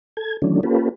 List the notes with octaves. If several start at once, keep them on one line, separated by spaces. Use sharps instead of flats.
A4 G#6
D#3 E3 F#3 A3 C#4 D4
A#3 C#4 F4 G4 A4 B4